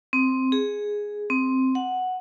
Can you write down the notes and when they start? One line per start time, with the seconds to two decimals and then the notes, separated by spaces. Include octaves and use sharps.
0.13 C4
0.52 G#4
1.30 C4
1.75 F#5